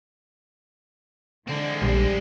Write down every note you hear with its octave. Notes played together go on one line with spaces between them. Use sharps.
D3 E3 G#3 C4
A#1 G3